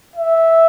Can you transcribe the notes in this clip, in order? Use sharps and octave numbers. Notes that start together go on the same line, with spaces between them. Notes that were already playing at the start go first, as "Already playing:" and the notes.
E5